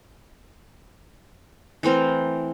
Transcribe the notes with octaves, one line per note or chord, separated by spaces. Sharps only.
E3 A3 C4 A#4